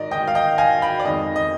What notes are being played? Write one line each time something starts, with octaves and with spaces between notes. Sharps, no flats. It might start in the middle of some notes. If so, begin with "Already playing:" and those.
Already playing: G#2 D#3 D5 D#5
G#2 D#3 G#3 D#5 G5
F5
D#5 G5
F5 G#5
G5 B5
D5
F2 D#3 G#3 D#5
D#5